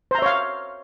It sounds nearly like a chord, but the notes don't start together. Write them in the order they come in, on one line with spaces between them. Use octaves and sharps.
C5 A#5 E5 C#5 F5